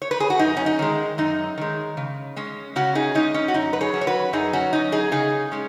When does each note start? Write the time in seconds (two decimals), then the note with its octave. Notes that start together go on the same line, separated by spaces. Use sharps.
0.02 C#5
0.11 B4
0.20 G#4
0.30 F#4
0.39 F#2 D#4
0.57 C#4
0.66 D#4
0.79 D#3 G#3
1.18 F#2 D#4
1.58 D#3 G#3
1.97 C#3
2.36 G#3 C#4
2.76 C#3 C#4 F#4
2.95 D#4 G#4
3.15 G#3 C#4 D#4
3.34 C#4
3.48 F#4
3.54 F#2 D#4
3.73 B4
3.81 G#4 C#5
3.94 F#3 C#4
4.01 C#5
4.07 F#4 B4
4.33 F#2 D#4 G#4
4.53 C#4 F#4
4.73 F#3 C#4 D#4
4.92 D#4 G#4
5.12 C#3 D#4 G#4
5.52 G#3 C#4